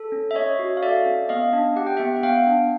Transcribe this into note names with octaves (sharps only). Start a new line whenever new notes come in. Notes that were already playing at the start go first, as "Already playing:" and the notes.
Already playing: A4
C#4
E5
C#4 C#5 D#5
F#4
F5
A4 D5 E5
C#4
B3 D#5 F5
D4
G4 F#5
G5
B3 E5 F#5
F#5
B3 F5 G5
D4